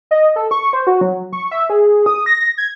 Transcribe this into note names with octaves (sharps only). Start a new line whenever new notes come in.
D#5
A4
C#6
C5
F#4
F#3
C#6
E5
G#4
D#6
A#6
G#6